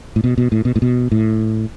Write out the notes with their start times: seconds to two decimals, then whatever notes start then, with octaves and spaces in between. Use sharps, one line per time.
0.16 A2
0.24 B2
0.38 B2
0.52 A2
0.65 B2
0.76 A2
0.82 B2
1.12 A2